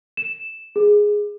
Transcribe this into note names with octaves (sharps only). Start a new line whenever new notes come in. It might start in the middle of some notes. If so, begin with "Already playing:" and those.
E7
G#4